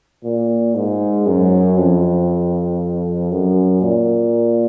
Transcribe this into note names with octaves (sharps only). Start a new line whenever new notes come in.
A#2
G#2
F#2
F2
F#2
A#2